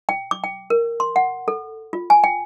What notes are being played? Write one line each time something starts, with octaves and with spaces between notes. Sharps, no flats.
G5
D6
G5
A#4
C6
F#5
A4
F4
G#5
G5